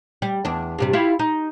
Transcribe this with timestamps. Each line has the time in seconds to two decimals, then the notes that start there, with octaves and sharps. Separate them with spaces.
0.22 G3
0.45 E2 D4
0.79 G2 C3 G3
0.93 E4 F4 G4
1.19 D#4